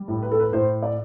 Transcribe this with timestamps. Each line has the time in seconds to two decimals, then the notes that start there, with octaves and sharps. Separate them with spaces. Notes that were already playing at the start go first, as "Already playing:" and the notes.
Already playing: G3
0.08 A2
0.22 B4
0.32 A4
0.40 B4
0.52 A2 C5
0.83 D5